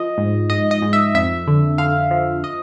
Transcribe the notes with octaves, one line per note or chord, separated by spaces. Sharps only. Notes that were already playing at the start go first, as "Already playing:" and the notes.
Already playing: F3 D#5
G#2
G#2 D#5
D#5
G#2
E5
F2 E5
D3
D3 F5
F3
D#5